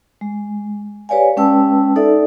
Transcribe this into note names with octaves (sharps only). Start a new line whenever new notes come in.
G#3
G4 B4 C#5 D5 F5 G#5
G#3 C#4 B4 G5 A5 E6
D#4 A4 D5 E5